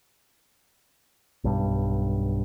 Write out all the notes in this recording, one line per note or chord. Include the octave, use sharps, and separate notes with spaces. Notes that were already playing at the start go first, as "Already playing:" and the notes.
B1 G2